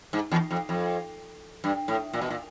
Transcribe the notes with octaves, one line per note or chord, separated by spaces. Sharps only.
G#2
E2
F2
F2
G2
A2
A#2
B2
A#2